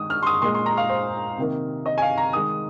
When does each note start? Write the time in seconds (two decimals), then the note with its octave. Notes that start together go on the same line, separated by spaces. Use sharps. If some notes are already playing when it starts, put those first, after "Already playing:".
Already playing: D#3 G#3 D#6
0.10 F6
0.23 C6
0.26 D#6
0.42 A#2 G#3 C6
0.55 C6
0.66 A#5
0.77 F5
0.89 C5
1.38 C3 D#3 A#3
1.86 D#5
1.98 G#5
2.02 F5
2.17 A#5
2.33 D#3 G#3 D#6